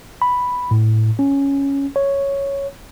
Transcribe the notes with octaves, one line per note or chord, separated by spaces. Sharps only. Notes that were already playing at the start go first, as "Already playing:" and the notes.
B5
A2
C#4
C#5